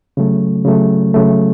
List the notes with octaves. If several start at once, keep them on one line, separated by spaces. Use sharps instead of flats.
C#3 F#3 A3
C#3 F#3 A3
C#3 F#3 A3